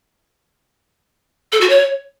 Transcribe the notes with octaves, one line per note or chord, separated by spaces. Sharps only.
A4
F#4
C#5